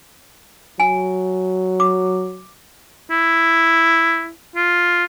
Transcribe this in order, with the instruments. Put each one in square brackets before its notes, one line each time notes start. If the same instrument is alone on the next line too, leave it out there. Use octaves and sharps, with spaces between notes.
[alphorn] F#3 [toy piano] G#5
[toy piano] D6
[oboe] E4
F4